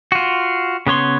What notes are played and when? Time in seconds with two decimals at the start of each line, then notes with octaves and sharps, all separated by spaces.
0.12 F4 F#4
0.87 C#3 B3 C#5 C6